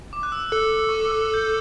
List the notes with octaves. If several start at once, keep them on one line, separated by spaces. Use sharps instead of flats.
D6
F#6
E6
A4 F#6
C#6
D6
E6
F#6
G6